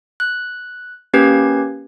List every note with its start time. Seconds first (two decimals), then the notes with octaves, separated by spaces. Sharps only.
0.20 F#6
1.13 A#3 C#4 G4 B4 G#6